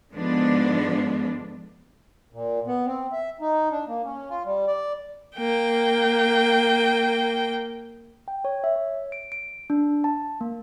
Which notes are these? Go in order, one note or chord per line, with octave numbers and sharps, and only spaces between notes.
G#2 D3 F3 G#3 B3 D4
A#2
B3
C4
E5
D#4
D4
A#3
C#4
F4
G3
D5
A#3 G5
G5
C#5
E5
C#5
D7
D7
D4
A5
A#3